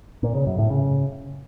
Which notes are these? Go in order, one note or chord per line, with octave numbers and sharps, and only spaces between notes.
A#2
C#3
F#2
A2
C#3